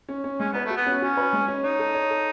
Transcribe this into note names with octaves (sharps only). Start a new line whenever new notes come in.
C#4
C#4
G#3 C#4
B3 B4
A3 F#4
B3
C#4
C#4 F#4
B4
G#3
C#4
D#4 C#5
A4
C#5
A4